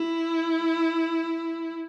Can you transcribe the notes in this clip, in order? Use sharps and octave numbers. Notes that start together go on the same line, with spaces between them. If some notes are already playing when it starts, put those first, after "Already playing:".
Already playing: E4